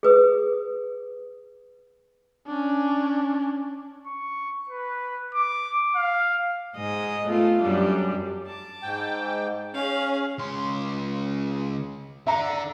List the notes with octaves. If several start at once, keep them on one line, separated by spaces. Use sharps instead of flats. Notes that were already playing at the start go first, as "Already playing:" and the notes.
G#4 B4 D#6
C#4 D4
C#6
B4
D6
F5
G#2 G#3 D#5
A3 B3 F4
F#2 G3 D4
A5 D6
G#2 G5
C#4 G#4 F5
C#2 C6
D3 E5 A#5